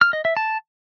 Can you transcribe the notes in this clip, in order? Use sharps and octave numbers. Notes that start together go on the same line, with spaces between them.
F6
D#5
E5
A5